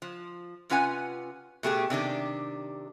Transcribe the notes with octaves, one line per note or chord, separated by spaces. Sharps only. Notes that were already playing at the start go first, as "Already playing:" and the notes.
F3
C3 C#4 F4 B4 F#5 G#5
B2 A3 G4 G#4
C3 D#3 D4 G4